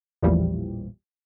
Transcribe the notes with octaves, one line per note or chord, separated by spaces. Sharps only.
A1 E2 A#2 E3 F3 G3